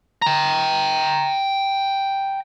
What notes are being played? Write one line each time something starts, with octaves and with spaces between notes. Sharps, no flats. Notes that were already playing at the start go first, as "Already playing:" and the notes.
G5 A#5